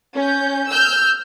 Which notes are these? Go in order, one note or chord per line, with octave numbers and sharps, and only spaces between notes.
C#4 G6
E6 F6 G6